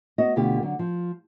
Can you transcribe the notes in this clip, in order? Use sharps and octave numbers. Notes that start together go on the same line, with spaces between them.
B3 F#4 D#5
D2 B2 D3 F4 G4
D3 F#3
F3